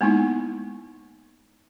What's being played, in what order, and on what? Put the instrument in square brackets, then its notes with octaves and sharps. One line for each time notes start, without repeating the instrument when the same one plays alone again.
[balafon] G#3 A#3 B3 D#4 E4